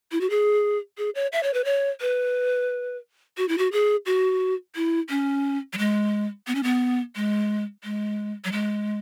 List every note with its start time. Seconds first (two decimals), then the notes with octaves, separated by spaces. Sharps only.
0.12 E4
0.21 F#4
0.30 G#4
0.98 G#4
1.15 C#5
1.33 E5
1.43 C#5
1.54 B4
1.65 C#5
2.01 B4
3.37 F#4
3.48 E4
3.58 F#4
3.72 G#4
4.06 F#4
4.76 E4
5.10 C#4
5.73 F#3
5.78 G#3
6.47 B3
6.55 C#4
6.63 B3
7.16 G#3
7.84 G#3
8.45 F#3
8.52 G#3